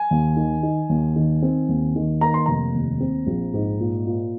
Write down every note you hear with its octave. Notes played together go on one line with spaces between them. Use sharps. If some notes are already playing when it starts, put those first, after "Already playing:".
Already playing: G#5
D#2
D#3
D#4
D#2
D#3
C4
D#2
D#3
A#3 A#5
C6
F1 A#5
D#2
C4
A#1
G#2
A#2
A#2